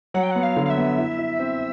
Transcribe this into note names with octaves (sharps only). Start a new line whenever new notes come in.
F#3 F#5
G5
B3 F#5
F5
D3
F5
E5
B3
E4
E4
C4